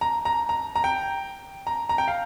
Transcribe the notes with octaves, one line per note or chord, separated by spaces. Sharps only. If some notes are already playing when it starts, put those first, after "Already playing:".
A#5
A#5
A#5
A#5
G5
A#5
A#5
G5
F5